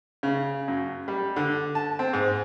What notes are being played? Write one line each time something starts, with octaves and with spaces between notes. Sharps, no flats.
C#3
F#2
G3
D3
A5
C4
G#2